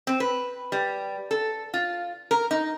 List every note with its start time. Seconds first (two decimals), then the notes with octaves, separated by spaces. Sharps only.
0.07 C4
0.20 B4
0.72 G3
1.31 A4
1.74 F4
2.31 A#4
2.51 D#4